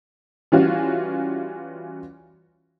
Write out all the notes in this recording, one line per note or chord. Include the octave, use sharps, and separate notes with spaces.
E3 G3 C#4 F4 F#4